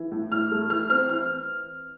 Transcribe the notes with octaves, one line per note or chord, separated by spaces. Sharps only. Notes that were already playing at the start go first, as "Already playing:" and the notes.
Already playing: E3
A2
A2 F6
A3
E3 F6
C4 F6
E3 F6